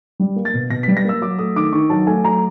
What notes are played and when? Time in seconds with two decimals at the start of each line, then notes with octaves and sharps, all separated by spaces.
0.20 G3
0.36 A#3
0.45 A6
0.54 B2
0.70 B2 A#6
0.83 G3 B6
0.97 A#6
1.05 A#3 E6
1.21 F#3 D6
1.39 A3 D#6
1.56 D#3 D6
1.73 D#3 C#6
1.90 F#3 A5
2.07 A3 G#5
2.24 F#3 A#5